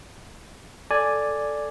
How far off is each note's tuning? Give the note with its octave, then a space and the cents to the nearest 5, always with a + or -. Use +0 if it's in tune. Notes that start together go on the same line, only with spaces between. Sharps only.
A4 +0 D5 +0 G#5 +0